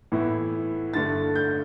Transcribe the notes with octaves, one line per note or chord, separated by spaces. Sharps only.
A2 E3 B3 E4
G2 D3 A3 A6
G6